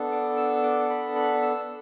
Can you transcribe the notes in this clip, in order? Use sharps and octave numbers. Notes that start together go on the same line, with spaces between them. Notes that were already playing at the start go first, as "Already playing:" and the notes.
Already playing: B3 D4 A4
D6
E6
D6
B5
B5
E6